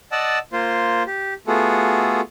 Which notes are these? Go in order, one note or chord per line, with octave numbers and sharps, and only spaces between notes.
D5 D#5 F#5 A5 E6
A#3 F4 C5
G4
A3 B3 F4 F#4 G#4 A4